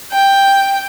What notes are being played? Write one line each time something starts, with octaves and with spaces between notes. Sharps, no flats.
G5